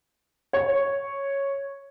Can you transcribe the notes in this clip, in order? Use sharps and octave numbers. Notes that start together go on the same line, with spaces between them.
C#5